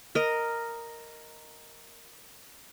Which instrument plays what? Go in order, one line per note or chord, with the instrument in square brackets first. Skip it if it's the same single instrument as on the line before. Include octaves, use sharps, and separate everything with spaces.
[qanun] A#4 D#5